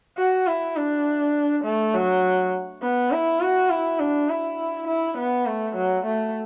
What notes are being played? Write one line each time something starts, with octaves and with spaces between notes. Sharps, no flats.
F#4
E4
D4
A3
F#3
B3
E4
F#4
E4
D4
E4
E4
B3
A3
F#3
A3